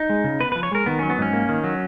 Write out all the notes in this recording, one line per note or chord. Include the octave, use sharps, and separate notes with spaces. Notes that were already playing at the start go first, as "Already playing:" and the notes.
Already playing: D#4
G#3
C#3
B3 B4
F3 B4
C#5
G#3 A#4
D#3 B3
F#3 C#4
B3
G#2 C#4
A#3
D#3
F#3